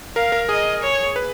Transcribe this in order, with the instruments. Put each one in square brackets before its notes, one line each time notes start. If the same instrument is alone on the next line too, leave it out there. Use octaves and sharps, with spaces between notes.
[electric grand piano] A#4 [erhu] F5
[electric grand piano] A#4
[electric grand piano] G#4 [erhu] D#5
[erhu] C#5
[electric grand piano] B4